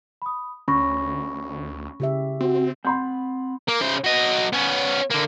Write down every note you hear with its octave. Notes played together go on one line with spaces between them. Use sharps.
B5 D#6
D2 C#4 B5 C#6 A#6
C#3 G4 E5
C4 F#4
C4 F#5 B5 C6 G6
A#3
C#3 C5
F#3 D#5
B3 C#4
D3 A#3